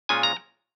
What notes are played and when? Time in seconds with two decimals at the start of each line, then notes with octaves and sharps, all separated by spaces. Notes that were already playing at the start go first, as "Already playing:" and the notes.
0.09 A#2 G#3 C#4 F4 G#5
0.23 A#5